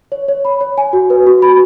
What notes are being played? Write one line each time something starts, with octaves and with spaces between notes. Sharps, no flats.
C#5
C#5
B5
C#5
G#5
F#4
B4
F#4
B5